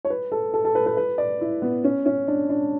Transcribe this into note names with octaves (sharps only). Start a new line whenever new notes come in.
C#5
B4
A4
A4
A4
B4
B4
B4
D5
E4
B3
C#4
C#4
D4
D4